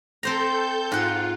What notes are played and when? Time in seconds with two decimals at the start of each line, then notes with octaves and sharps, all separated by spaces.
0.23 C4 A4 C5 A#5 G6
0.92 G#2 F4 F#5